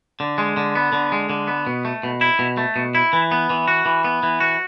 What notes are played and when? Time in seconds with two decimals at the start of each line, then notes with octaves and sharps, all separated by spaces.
0.20 D3
0.38 G#3
0.57 D3
0.75 B3
0.93 D3
1.12 G#3
1.30 D3
1.47 B3
1.67 B2
1.85 A3
2.03 B2
2.21 E4
2.39 B2
2.57 A3
2.76 B2
2.95 E4
3.13 E3
3.31 B3
3.50 E3
3.68 F#4
3.86 E3
4.04 B3
4.23 E3
4.40 F#4